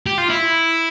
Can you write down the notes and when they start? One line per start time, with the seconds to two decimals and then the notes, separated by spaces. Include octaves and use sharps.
0.06 G4
0.18 F4
0.30 E4